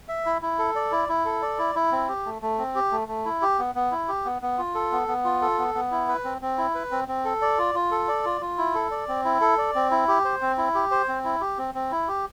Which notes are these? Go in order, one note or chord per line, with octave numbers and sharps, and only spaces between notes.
E5
E4
E4
A4
D5
E4
E4
A4
D5
E4
E4
C4
G4
A3
A3
C4
G4
A3
A3
E4
G4
B3
B3
E4
G4
B3
B3
F4
A4
B3
B3
F4
A4
B3
B3
E4
B4
C4
C4
E4
B4
C4
C4
A4
D5
F4
F4
A4
D5
F4
F4
E4
A4
D5
C4
E4
A4
D5
C4
E4
G4
C5
C4
E4
G4
C5
C4
E4
G4
C4
C4
E4
G4